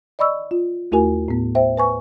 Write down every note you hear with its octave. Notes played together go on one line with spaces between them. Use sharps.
D5 D#5 B5 C#6 E6
F4
D#2 A3 E4 F#4 A#4 G#5
A2 B3
C5 E5 G5
B4 G#5 C#6